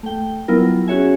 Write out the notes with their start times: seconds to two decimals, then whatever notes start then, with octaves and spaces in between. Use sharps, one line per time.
0.03 A3 G5
0.48 F#3 G3 B3 E4 F4 A#4
0.88 C#4 F#4 G#4 C#5 E5 G#5